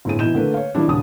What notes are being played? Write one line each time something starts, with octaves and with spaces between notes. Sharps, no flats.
G1 A2 C4 G#4 D#7
B2 E3 D#4 E4 G6 E7
D3 A3 A#3 B4
C#5 F5
D#3 F3 G3 C4 D4 E4
D#1 C#3 D4 D#6